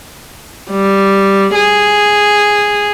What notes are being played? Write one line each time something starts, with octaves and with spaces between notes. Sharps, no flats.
G3
G#4